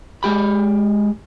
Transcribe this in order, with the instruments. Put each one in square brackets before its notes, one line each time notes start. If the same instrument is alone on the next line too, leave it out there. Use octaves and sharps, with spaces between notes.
[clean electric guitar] G#3 G4 B5